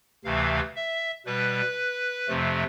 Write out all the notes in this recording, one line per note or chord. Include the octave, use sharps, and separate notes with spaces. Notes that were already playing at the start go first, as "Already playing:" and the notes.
D2 C3 E3 A3 F5
E5
B2 G3 B4
F2 C3 F3 A3